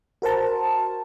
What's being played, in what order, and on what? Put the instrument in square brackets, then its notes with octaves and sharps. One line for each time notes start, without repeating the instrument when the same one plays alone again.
[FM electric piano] F#4 A#4 C5 A5